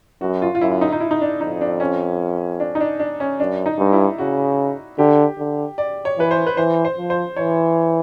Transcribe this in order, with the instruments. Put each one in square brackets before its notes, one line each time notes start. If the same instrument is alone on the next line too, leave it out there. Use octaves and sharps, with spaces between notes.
[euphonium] F#2 [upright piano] F#4
[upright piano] F4
F4
[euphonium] F#2 [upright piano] E4
[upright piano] D#4
D#4
E4
D#4
D4
[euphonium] F2 [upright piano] D#4
[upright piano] D4
C#4
D4
D#4
D4
D4
C#4
[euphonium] F#2 [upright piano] D4
[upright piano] D#4
[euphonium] G2
[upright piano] E4
[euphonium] C#3 [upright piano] F#4
[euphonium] D3 [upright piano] G4
[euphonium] D3
[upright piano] D5
C#5
[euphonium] E3 [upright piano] B4
[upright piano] C5
B4
[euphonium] E3 [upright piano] C5
[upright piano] C5
[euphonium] F3
[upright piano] C5
[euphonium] E3 [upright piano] C#5